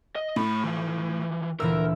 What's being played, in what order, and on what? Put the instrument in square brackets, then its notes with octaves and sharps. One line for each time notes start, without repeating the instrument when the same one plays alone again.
[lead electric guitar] D#5
[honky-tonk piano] A2 [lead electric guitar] A3 B5
[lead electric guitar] E3 F3
[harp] D2 A#2 E3 [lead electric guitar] A#4 [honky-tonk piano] E6